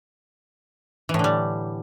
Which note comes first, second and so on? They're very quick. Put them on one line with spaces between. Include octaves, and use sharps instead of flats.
E3 A2 D3 G3